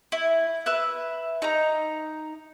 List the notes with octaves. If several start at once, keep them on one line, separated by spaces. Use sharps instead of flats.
E4
B4 E5 F#6
D#4 A#5